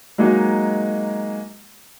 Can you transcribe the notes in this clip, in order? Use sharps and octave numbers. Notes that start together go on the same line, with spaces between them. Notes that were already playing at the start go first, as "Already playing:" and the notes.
F#3 G#3 A#3 D#4